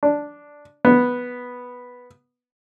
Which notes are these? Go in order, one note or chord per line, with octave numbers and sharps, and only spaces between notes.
D4
B3